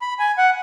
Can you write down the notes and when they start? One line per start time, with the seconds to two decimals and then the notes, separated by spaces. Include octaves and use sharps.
0.02 B5
0.19 G#5
0.38 F#5